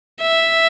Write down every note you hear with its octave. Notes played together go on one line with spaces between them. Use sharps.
E5